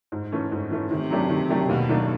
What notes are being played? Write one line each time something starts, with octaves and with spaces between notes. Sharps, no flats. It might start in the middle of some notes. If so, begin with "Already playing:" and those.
G#2
E3 A3 C#4
G#2
E3 A3 C#4
C3 D#3
F#3 A3 D4 G4
D#3
F#3 A3 D4 G4
D#2 B2
D#3 F#3 A3 D4